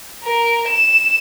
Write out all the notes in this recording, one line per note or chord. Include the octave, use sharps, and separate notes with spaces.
A#4
E7